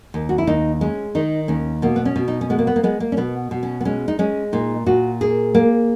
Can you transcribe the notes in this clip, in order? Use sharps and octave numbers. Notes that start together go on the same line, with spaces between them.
D#2
F#4
E4
D#2 D#4
G#3 C#4
D#3 D#4
D#2 C#4
B2 A#3
B3
C#4
B2
D#4
C#4
G#3 B3
A#3
B3
A#3
G#3 B3
A#3
C#4
B2 B3
B2
C#4
B3
G#3 C#4
D#4
G#3 C#4
A#2 D#4
A#2 F#4
A#3 G#4
A#3